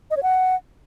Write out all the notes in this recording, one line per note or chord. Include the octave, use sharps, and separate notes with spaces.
D#5
C#5
F#5